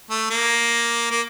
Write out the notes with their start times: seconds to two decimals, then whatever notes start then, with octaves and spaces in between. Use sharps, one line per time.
0.10 A3
0.30 A#3
1.10 A#3